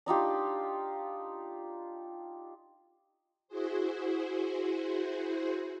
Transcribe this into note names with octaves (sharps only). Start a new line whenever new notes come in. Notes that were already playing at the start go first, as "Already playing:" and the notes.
D4 D#4 F4 G4
E4 F#4 G#4 C5